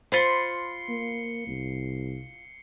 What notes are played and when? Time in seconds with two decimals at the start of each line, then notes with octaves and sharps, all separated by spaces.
0.12 F4 C5 B5 C6 C7 C#7 G7
0.89 A#3
1.47 C2